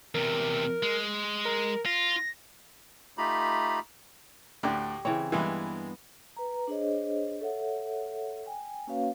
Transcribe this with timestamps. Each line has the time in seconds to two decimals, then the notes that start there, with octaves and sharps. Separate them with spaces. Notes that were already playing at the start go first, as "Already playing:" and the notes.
0.15 E2 C3 A#4
0.83 G#3
1.45 A#4
1.86 F4 A#6
3.18 A3 D#4 F4 G4 A#5 B5
4.63 D2 A2 D4 G4
5.05 C#3 E3 C4 C#5
5.32 G2 E3 G#3 A#3 B3
6.37 B4 A#5
6.68 D4 G#4 C5 C#5 D#5
7.41 A4 C#5 E5 F#5
8.46 G5 G#5
8.87 A#3 C#4 F#4 B4 C#5 F5